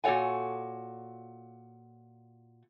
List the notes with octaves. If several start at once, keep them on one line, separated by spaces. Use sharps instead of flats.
A#2 F#4 A4 C#5 F#5 G#5